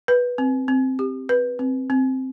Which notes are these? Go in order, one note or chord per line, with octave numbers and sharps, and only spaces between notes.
B4
C4
C4
G4
B4
C4
C4